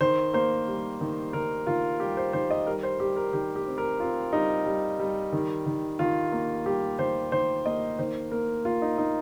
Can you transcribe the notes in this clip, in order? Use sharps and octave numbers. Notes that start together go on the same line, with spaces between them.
D#3 C5
A#3 C5
G3
D#3
D#3 A#4
D#3 F4
G3 G4
C5
D#3 C5
D#5
G3 A#4
C5
G3 G4
A#4
D#3 G4
G4
C4
A#4
C4 F4
G3 D#4
G3
G3
D#3
D#3
D#3 F4
A#3
G3 G4
D#3 C5
D#3 C5
A#3 D#5
D#3 C5
A#3 A#4
A#3 F4
D#4
A#3 D#4